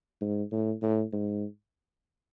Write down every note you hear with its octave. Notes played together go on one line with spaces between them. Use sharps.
G#2
A2
A2
G#2